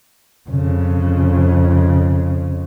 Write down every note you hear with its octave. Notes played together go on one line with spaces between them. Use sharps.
F2 C#3